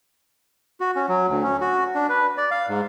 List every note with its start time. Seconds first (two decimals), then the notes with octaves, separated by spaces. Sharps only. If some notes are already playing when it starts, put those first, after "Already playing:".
0.80 F#4
0.96 C#4
1.09 F#3
1.28 D2
1.43 C#4
1.61 F#4
1.95 D4
2.09 B4
2.38 D5
2.51 F5
2.69 G#2